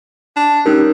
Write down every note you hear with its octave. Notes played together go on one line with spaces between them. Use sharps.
D4
G3 C#4 D#4 A#4